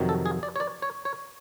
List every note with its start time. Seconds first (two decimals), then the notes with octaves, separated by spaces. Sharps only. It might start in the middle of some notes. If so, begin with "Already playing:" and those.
Already playing: F2 C3 D#3 F#3
0.09 A4
0.26 G#4
0.43 D5
0.56 C#5
0.60 D5
0.82 C#5
1.05 C#5